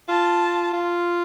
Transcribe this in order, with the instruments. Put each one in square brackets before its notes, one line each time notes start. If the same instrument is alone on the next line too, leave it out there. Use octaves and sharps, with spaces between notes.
[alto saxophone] F4 [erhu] A5
[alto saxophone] F4